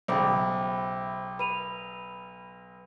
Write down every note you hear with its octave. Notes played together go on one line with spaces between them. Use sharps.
B1 C#3 C5 E5 G5 B5 D6
B4 B5 D#7 F7